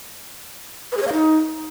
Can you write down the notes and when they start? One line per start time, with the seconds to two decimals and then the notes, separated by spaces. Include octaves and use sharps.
0.92 B4
0.97 G#4
1.02 C#5
1.07 F5
1.13 D#4